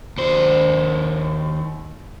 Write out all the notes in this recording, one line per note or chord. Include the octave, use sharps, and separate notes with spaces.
D#2 C5